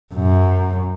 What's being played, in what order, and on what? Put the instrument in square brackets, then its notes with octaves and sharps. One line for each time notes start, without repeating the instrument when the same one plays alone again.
[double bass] F#2